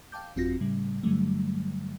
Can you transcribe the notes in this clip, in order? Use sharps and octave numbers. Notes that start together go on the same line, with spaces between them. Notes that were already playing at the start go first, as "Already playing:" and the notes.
F5 G5 A5 D6 G6
G1 F2 C4 F4 F#4 A#6
A2 C#3 G3
G2 D3 F#3 G3 A3